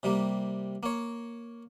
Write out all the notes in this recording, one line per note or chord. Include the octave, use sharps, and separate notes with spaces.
C3 G3 A#3
A#3 C#5